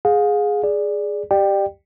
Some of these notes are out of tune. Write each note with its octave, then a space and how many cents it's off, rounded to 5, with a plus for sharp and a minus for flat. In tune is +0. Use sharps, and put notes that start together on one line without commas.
G#4 +0 F5 +35
G#4 +0 D5 +0
G4 +0 D5 +30 G5 +0